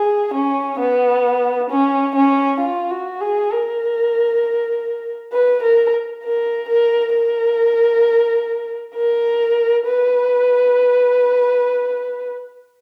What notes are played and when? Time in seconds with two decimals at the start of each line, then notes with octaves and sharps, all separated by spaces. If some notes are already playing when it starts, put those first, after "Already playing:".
Already playing: G#4
0.34 C#4
0.79 B3
1.70 C#4
2.16 C#4
2.60 F4
2.91 F#4
3.21 G#4
3.51 A#4
5.32 B4
5.63 A#4
6.23 A#4
6.68 A#4
7.13 A#4
8.95 A#4
9.86 B4